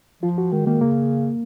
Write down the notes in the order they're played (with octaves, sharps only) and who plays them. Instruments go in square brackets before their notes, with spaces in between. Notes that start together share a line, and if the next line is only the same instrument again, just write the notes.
[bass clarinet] F3 [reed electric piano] F4
[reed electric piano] F#4
[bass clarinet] D#3 [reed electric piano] G#3
[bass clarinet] D#3 [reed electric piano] A#3
[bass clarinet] C#3 [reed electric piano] A#3